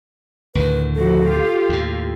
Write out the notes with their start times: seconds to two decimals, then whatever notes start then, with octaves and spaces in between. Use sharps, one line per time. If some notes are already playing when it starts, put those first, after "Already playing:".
0.55 D2 A2 D#3 B4
0.95 F3 F#4 A4
1.28 F4 G4
1.69 D#2 A2